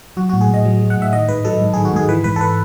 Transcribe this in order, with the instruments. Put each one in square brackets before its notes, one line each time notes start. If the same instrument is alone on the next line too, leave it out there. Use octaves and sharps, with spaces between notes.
[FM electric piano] F#3 F#4
F#4
A2
G#4
A2 D#5
F#3
F#3
F#5
A2 E5
D#3 D#5
G#2 B4
F#3 A4
G#2
G#4
D#3
F#4
G#2 G#4
E3 B4
G#2 B4
A4
B4